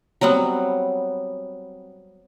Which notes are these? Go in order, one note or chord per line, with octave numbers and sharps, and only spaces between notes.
F#3 G3 B3 C4